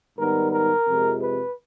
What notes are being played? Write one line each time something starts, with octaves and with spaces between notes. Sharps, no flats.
G#2 D#3 G3 B3 A#4
A#4
F2 C3 F3 G#3
B4